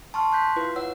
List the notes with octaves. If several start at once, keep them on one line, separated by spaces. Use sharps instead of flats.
A5 C6 C#6 F6
C6 F#6 G6 B6
E4 F4 B4
B4 C#5 F#5 E6